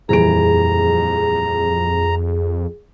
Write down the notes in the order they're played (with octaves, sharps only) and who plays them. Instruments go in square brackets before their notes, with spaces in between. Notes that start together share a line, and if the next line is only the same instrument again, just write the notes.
[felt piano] D#1 E3 D7 [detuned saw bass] F2 [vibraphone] G#4 [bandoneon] A#5